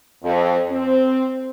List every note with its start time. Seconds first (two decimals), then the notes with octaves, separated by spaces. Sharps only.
0.24 F2
0.71 C4